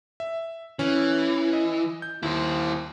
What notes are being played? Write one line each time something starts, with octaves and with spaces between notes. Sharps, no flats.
E5
E3 C#4
D#5
G6
D#2 E4 C5